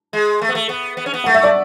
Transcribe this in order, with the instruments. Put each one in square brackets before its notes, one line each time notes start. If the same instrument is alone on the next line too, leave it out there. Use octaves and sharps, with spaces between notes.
[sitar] G#3
A3
B3
A3
B3
B3
C#4
B3
[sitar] A3 [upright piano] F#5
[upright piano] E5
D5